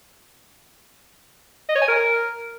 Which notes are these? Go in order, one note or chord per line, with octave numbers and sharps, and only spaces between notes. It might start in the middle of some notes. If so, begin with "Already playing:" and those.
D#5
C#5
G#5
A#4